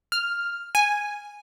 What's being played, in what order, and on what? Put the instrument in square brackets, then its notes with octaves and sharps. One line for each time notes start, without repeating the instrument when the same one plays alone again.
[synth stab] F6
G#5